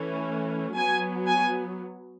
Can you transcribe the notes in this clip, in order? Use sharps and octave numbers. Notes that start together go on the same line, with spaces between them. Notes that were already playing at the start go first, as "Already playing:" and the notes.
Already playing: E3 A3 C#4
F#3 B3 G#5
G#5